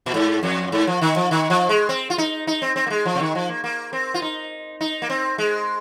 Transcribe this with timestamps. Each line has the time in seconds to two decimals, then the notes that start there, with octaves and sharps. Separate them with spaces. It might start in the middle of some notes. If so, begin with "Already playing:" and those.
0.06 A#2
0.14 G#2
0.43 F2
0.72 G#2
0.87 F3
1.01 D#3
1.16 F3
1.31 D#3
1.50 F3
1.69 G#3
1.89 C4
2.10 F4
2.18 D#4
2.47 D#4
2.62 C4
2.76 C4
2.87 A#3
2.90 G#3
3.05 F3
3.15 C3
3.20 D#3
3.35 F3
3.49 A#3
3.64 A#3
3.93 C4
4.14 F4
4.22 D#4
4.81 D#4
5.02 A#3
5.10 C4
5.38 G#3